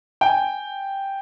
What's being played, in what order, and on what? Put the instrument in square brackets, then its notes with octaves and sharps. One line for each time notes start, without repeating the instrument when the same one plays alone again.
[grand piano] G5 G#5